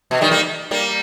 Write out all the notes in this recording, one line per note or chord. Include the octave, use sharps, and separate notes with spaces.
B2
D#3 G3
G3 A#3
G3 A#3